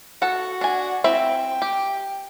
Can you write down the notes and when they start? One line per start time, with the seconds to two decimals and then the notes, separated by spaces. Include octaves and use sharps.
0.22 F#4 A4 F#5
0.61 D4 G#5
1.04 C4 E4 E5 G5
1.62 G4